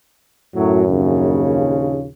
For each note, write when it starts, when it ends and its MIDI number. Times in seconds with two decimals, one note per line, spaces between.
0.55 1.65 42
0.55 0.82 45
0.55 0.82 54
0.87 2.07 34
0.87 2.07 39
0.87 2.07 49